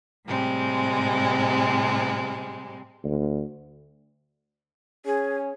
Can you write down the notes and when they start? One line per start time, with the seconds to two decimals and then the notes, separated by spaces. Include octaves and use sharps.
0.25 A2 C3 G3 G#3 C4
3.04 D2
5.05 C#4 G#4